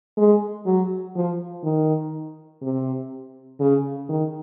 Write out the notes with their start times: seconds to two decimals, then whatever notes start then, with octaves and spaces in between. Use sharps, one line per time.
0.17 G#3
0.66 F#3
1.16 F3
1.64 D#3
2.62 C3
3.60 C#3
4.09 D#3